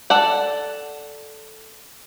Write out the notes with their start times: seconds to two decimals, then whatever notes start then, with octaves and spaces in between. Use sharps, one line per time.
0.10 A4 D5 F#5